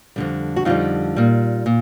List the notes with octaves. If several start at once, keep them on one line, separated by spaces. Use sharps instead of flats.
F2 D3 G3
F#4
F2 D3 G3 D#4 F4
A#2 G3
A#2